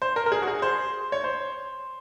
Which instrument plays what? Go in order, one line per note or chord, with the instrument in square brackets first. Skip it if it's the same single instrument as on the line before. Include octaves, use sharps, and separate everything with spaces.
[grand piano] C5
A#4
A#4
G#4
F#4
G#4
C5
C#5
C5